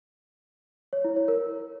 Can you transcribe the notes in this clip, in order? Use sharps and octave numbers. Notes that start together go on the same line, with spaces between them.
C#5
E4
C#5
A#4